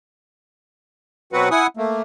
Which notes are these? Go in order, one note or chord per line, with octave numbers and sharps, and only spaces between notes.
B2 F#3 C4 F#4 B4 F#5
E4 F#5 G#5 D#6
A3 A#3